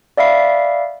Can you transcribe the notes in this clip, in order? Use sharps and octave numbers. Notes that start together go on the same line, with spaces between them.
D5 E5 F5 B5 C7